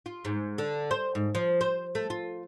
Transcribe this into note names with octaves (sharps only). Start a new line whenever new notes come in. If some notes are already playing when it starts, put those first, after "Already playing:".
F4
G#2
D3
C5
G#2
F3
C5
A3
F4